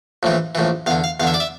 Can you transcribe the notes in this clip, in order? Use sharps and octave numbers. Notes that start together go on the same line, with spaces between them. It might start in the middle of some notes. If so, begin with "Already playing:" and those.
A#1 A2 E3
A#1 A2 E3
E2 D3 F5
F5
E2 D3 E5 F5
D5
E5